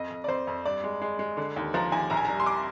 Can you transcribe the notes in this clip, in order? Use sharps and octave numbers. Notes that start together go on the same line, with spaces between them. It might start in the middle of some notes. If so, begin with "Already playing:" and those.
Already playing: F2 D#5
F2
D5
F2 C5
F2
G2 D5
G#3
G#3
G#3
D3
D#2
F3 A#5
D#2 G#5
A#1 A#5
G#5
G3 A#5
C6
D6